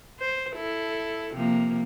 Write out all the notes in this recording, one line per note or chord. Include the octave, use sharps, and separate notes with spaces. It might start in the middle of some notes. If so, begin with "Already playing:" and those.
C5
E4 A4
C3 F3 A#3